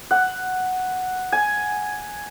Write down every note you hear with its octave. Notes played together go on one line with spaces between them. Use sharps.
F#5
G#5